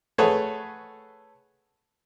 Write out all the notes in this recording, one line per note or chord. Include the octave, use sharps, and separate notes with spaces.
A3 G#4 A4 B4 C#5 F#5